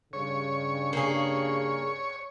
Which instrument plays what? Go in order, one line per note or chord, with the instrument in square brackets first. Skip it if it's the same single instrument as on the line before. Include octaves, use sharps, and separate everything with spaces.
[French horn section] G2 C#3 [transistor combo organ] C#5
[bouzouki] A#3 G#4